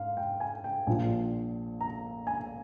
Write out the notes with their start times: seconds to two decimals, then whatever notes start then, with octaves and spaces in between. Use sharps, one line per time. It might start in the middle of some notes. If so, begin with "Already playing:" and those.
Already playing: G#2 F5
0.17 G5
0.40 G#5
0.64 G5
0.87 A#1 A#2 F3 G#5
1.81 A#5
2.27 G#5